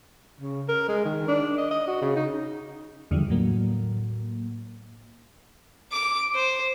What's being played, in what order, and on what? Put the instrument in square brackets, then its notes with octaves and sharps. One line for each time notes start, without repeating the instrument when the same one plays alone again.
[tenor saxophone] C#3
A#4
G#3
D#3
D4
D#5
D#5
F#4
C#3
D#4
[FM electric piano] E2 D3 E3 F3 G3
A2 F#3 A#3
[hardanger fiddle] D6
C5